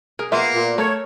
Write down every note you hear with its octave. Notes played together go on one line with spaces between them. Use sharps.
G#4 A#4
A#3 B3 F4 E5 F5
A#2
A3 A4 A#4 C#5